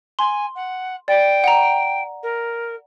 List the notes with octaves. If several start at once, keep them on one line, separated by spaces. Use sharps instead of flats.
G#5 C6
F#5
D5 G5
F#5 A#5
A#4